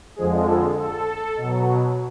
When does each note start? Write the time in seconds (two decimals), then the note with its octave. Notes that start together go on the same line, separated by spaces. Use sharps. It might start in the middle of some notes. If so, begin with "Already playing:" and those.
0.16 F2 D3 F3 G#3 G#4
0.46 A4
0.76 A4
1.36 B2 F#3